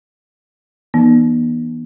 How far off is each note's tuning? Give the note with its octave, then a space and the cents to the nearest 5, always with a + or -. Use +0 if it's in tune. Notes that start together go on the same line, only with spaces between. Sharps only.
E3 -15 B3 -40 D#4 -30